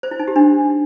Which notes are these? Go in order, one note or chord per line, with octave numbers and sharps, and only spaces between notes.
C5
E4
D#4
G4
D4